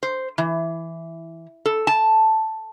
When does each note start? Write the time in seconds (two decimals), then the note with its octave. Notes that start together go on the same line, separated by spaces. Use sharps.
0.03 C5
0.38 E3
1.66 A4
1.87 A5